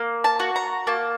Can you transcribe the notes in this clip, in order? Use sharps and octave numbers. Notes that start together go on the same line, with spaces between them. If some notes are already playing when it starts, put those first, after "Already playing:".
Already playing: A#3
A5
F#4
A#5
A#3 A5